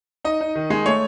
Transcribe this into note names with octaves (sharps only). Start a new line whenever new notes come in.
D#4 D#5
D#4
D#3
G#3
A3 C#5